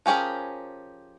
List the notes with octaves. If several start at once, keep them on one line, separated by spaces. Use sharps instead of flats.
F3 C#4 G4 G#4 A#4